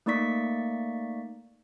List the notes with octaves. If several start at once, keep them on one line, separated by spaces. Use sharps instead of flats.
A3 A#3 D#4 D5 C#6 B6